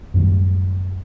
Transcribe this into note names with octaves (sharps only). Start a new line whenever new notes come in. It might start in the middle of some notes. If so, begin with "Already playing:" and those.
F#2 A2 D#3 G3